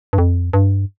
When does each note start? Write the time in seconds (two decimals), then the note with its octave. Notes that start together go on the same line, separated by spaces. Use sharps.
0.13 G2
0.18 F2
0.53 G2